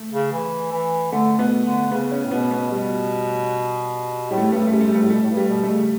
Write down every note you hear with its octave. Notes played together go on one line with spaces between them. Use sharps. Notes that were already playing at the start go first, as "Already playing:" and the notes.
Already playing: A3
C#3
E3
E3
D3 A3
B2 B3
D3
C#3 B3
C#4
A2
B2 B3
B3
B2 G3
A2 G3
A3
G3
G2 A3
G3
A3
F#2 G3
A3
F#2 G3
G2 A3
A2 G3
B2 A3
A2
G2
G3
B2
A3
C#3